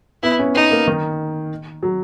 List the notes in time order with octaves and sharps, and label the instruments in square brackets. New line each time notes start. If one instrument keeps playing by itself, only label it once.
[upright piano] B3 [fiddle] E4
[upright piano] C#4
[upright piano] B3 [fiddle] D#4
[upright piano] A#3
D#3
F#3